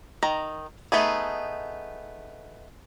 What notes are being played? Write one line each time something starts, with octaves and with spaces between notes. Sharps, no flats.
D#3 A#5
A3 B3 D#4 G#4